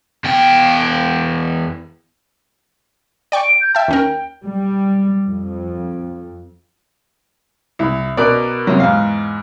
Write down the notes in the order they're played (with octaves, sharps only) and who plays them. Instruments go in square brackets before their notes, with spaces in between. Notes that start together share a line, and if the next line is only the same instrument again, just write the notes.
[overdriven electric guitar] E2 G5
[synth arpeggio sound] D5 G5 C#6
[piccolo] D7
G6
[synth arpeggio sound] E5 A5 [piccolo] G5
[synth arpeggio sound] D#2 C#4 A#4
[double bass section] G3
F2
[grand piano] C2 [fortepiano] E4
[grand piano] B2 A#4 F#6 [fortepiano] D5
[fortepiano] C3 F#3
[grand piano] E2 G#2 [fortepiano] F5